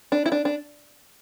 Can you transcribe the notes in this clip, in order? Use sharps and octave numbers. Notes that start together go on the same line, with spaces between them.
D4
E4
D4
D4